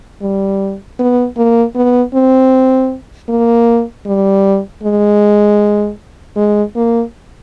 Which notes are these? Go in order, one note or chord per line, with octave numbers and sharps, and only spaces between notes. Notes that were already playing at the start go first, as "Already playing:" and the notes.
G3
B3
A#3
B3
C4
A#3
G3
G#3
G#3
A#3